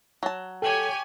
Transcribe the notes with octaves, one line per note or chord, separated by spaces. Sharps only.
F#3 A5
G4 A4 C#5 G5 G#5 F#7